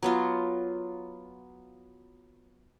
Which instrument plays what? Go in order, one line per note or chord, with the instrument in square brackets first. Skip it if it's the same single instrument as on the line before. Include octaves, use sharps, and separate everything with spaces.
[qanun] F#3 B3 F4